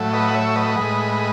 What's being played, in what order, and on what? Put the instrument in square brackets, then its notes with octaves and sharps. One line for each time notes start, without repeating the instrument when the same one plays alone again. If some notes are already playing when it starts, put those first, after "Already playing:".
Already playing: [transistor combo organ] A2 F#3 A3
B4 D#5
F#5
C#5 E5
B4 D#5
A2 G#3